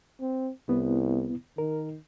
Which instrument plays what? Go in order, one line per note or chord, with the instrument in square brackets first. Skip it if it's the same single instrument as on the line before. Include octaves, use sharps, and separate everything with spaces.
[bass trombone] C4
[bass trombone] C2 [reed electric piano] B3 E4
[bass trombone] D#3 [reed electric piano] A#4